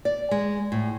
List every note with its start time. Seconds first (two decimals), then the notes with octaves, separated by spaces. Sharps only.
0.05 D5
0.31 G#3
0.72 A2